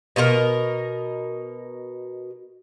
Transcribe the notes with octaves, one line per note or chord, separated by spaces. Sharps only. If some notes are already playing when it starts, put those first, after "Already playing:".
B2 D#4 F4 A#4